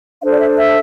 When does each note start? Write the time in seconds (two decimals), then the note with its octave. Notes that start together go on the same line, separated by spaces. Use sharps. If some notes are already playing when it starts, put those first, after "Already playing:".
0.22 D4 A4 C5 F5
0.33 D5
0.39 E5
0.57 E5